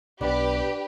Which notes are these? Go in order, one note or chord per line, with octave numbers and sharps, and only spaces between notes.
B1 B2 D4 G4 B4 B5